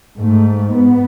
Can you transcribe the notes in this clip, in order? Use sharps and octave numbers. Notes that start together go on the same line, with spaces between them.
G#2 A3
B3